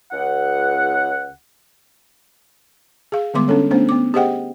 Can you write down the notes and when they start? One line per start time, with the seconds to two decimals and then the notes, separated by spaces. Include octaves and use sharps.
0.12 C#2 F#5
3.12 G#4 F5
3.34 D3 G3 G#3 B3 C6 D6
3.48 C#4 D4 A4 C#5
3.71 A3 B3 C#4 D4 C5
3.89 B3 D6
4.14 G4 G#4 C5 D#5 F#5 G5